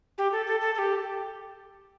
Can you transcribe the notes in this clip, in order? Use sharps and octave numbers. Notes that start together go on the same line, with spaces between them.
G4
A4
A4
A4
A4
G4